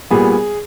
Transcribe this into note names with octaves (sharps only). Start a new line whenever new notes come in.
A#2 G3 B3 G#4